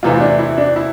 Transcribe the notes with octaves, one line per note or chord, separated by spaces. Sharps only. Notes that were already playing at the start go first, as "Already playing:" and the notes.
E2 C3 E3 A3 F4
E4
D4
E4
D4
E4